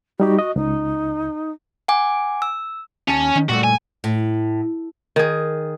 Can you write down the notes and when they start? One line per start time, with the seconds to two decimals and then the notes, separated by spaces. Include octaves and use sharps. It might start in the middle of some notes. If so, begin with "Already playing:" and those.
0.20 G3 D#4 F#4 G4
0.39 F#4 D#5
0.56 C#2 D#4
1.88 F#5 G#5 D6
2.42 E6
3.08 D#2 C#4 A5
3.36 D#3
3.49 A#2 G3 A3 F#4
3.64 G#5
4.04 A2
5.16 D#3 G#4